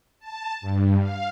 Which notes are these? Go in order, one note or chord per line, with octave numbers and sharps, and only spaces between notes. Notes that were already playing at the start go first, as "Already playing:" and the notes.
A5
G2
F5